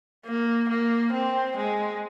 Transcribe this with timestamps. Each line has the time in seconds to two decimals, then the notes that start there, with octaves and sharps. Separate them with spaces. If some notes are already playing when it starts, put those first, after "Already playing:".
0.26 A#3
0.69 A#3
1.13 C4
1.57 G#3